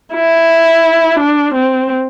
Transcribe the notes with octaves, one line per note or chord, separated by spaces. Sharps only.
E4
D4
C4